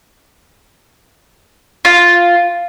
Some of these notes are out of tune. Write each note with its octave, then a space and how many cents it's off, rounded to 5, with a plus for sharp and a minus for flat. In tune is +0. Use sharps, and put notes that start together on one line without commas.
F4 +0